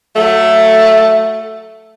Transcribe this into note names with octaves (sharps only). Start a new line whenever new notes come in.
F#3 A3